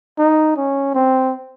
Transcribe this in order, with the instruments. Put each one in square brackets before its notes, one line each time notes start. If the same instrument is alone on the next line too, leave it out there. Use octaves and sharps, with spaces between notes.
[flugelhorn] D#4
C#4
C4